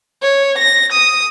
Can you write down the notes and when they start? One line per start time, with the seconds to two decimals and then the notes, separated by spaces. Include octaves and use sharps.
0.22 C#5
0.58 A#6
0.92 D#6